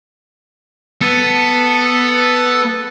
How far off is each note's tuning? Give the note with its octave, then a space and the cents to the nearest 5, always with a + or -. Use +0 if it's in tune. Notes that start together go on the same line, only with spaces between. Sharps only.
B3 +0 A4 +0